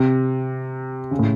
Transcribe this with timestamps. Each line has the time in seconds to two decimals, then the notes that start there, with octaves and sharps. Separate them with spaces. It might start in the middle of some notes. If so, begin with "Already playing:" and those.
Already playing: C3
1.11 C#3
1.19 A2